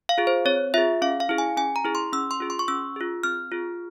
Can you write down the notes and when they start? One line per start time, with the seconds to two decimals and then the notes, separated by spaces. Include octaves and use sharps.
0.09 F5
0.18 F4 G#4
0.27 C5
0.45 C4 C#5
0.74 F4 G#4 E5
1.02 C#4 F5
1.20 F5
1.29 E4 G#4
1.38 G#5
1.57 C#4 G#5
1.76 A#5
1.85 E4 G#4
1.95 C6
2.13 C#4 E6
2.31 C6
2.40 F4 G#4
2.50 C6
2.59 C#6
2.68 C#4 E6
2.96 F4 G#4
3.23 C4 F6
3.52 F4 G#4